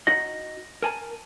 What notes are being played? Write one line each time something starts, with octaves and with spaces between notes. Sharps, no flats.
D#4 F#4 D#5 A#6
A#4 G#5 A5